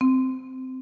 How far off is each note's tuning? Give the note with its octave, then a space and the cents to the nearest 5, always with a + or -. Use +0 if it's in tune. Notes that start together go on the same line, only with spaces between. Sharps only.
C4 -15